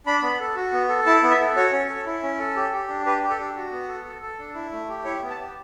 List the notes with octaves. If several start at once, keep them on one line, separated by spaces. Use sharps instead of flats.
D4 B5
B3
A4
F#4
B3
A4
E4 A5
B3
E5
A4
F#4 C#5
C#4
A4
E4
C#4
A4
G4
G4
D4
G4 B4
G4
A4
D4
F#4
B3
A4
A4
A4
D4
E4
A3
G4
E4 C#5
B3
A5
G4